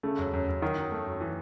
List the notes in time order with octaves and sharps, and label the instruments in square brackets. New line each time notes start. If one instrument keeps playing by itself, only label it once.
[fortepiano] C#3 [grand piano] A3
[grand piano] F#2
F#2
F#2
[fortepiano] D#3 [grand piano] F#3
[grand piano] F#2
A3
F#2
E3